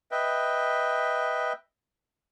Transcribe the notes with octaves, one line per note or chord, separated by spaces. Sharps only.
B4 D#5 E5 G5